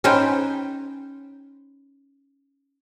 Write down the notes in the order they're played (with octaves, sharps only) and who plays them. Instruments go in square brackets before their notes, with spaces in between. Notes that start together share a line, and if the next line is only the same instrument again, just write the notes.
[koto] C#4 D#4 B4 C5 G5